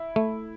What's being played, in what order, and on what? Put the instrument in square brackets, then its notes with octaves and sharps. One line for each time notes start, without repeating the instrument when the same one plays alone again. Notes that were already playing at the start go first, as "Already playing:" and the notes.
Already playing: [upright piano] E4
[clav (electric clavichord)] A3